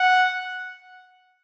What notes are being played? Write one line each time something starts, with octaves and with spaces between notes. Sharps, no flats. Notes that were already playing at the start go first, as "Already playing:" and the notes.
Already playing: F#5